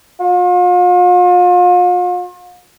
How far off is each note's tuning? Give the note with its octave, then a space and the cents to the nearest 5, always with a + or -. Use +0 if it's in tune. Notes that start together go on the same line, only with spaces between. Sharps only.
F4 +40